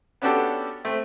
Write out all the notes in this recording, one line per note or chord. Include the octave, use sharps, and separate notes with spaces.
B3 C#4 D4 F#4 G4 A4
A3 C4